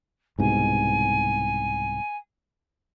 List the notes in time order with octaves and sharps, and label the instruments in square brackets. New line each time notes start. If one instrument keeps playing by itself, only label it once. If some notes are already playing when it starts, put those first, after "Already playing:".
[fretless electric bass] C2 G#2 B2 [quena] G#5